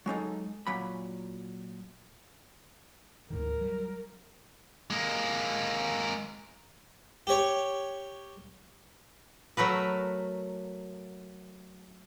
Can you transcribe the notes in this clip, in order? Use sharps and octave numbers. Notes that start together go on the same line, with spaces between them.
F#3 G#3 D#4 A4
A#2 F#3 B5
D2 G#2 D#3 A#4
F#3 G3
G#3 A#3
G4 C#5
F#3 A3 A#4 B4